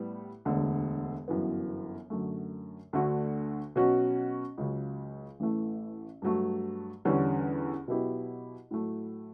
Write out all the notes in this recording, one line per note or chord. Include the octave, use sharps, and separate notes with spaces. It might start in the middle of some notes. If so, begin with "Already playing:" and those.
Already playing: A2 G3 B3
E1 D2 D3
G1 F#2 E3 B3
F#2 D3 F#3 A3
D2 D3 A3 D4 F#4
B2 F#3 C#4 F#4
C#2 C#3 F#3
A1 A2 E3 A3
G2 F#3 A3
E2 D3 G3 C#4
B2 F#3 B3 E4 G4
A2 F#3 A3